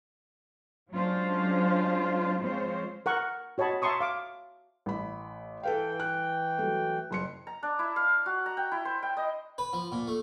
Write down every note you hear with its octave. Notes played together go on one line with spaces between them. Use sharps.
F#3 G#3 C#4 D4 F4 C5
F3 G#3 C4 F4 C5 C#5
A#4 F#5 C#6
F#4 C#5 D#5 A5 B5
E5 A5 A#5 C6 C#6 D#6
F5 D6
A1 B5
E3 A4 B4 F5 G5
F#6
F#3 A3
F#1 C6 C#7
A#5
D4
E4
F5
F#4
A#5
G5
E4
C5
G5
D#5
B4
F3
A#2
A3